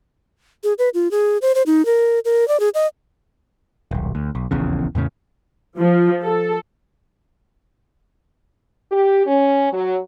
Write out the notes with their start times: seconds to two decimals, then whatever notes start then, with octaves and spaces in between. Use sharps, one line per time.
0.64 G#4
0.79 B4
0.94 F4
1.11 G#4
1.42 C5
1.55 C5
1.66 D#4
1.86 A#4
2.25 A#4
2.48 D5
2.60 G#4
2.75 D#5
3.91 D#1 B1
4.15 D2
4.35 B1
4.51 D#1 A#1 E2 C#3
4.95 E2 A2 C#3 C#4
5.77 F3
6.23 A4
8.92 G4
9.26 C#4
9.72 F#3